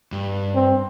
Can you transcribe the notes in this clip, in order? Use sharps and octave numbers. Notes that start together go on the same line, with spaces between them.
G2
C4